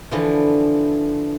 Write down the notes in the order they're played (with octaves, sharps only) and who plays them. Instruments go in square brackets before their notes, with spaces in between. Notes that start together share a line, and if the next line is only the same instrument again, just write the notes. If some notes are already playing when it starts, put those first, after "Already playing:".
[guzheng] D3 E3 F3